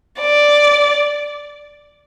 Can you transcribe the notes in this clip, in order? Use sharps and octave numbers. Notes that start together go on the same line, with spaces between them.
D5